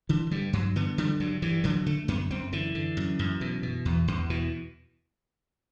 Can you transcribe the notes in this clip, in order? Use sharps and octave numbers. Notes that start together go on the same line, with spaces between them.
D3 E3
G2 G3
G2 F#3
D3 B3
D3 G3
G2 F#3
G2 E3
D3 F#3
D3 A3
F#2 B3
F#2 C4
D3 E3
D3
F#2
F#2
B2
B2
E2
E2
B2 E3